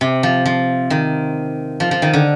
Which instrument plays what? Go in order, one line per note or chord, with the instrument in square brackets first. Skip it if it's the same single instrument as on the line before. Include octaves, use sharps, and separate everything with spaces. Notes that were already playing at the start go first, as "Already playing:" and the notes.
[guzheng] C3
F3
F3
D#3
F3
F3
D#3
D3